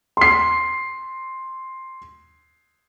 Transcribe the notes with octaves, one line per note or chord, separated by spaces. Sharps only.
C6 C7